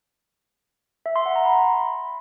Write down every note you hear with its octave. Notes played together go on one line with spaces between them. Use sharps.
E5
C6
F#5
A#5
B5